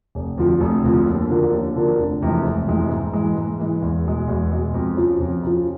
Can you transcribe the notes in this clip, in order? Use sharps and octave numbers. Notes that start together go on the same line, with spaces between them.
F1
F2 D3 F3
F1
F2 D3 F3
D#2
D3 F3 A#3 D4
D#2
D3 F3 A#3 D4
F1
F2 C3 E3 G#3
F1
F2 C3 E3 G#3
G#2
E3 G#3
G#2
E3 G#3
E2
B2 G#3
E2
B2 G#3
F2
C#3 F3
F2
C#3 F3